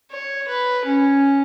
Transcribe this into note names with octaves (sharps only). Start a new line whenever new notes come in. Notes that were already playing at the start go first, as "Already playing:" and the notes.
C#5
B4
C#4